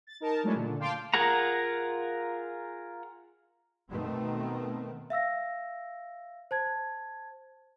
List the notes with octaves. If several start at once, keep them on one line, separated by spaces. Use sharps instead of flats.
A6
D#4 A#4 A5
F#3 G#3 A3 C#4 D4 E4
A#2 D3
F5 G5 A5 C6 D6
F4 G#4 A#4 F#5 A#5
B2 D#3 A3 B3 C4
E5 F5 E6 A#6
C5 A5 G#6